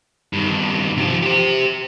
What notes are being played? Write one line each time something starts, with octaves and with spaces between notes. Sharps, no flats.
G2 D#3
C3 F3
G4 C5